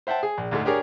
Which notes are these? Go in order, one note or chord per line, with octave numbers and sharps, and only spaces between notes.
C5 E5 F#5 G5 A5
G#4
A#1
D2 G#2 G#3 A3
D4 G4 G#4 A#4 C#5 D5